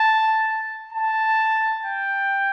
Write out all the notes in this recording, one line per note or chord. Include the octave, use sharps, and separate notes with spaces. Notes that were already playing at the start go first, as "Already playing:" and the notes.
Already playing: A5
A5
G5